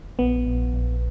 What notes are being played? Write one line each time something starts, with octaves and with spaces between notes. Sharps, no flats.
A#1 B3
A#1
A#1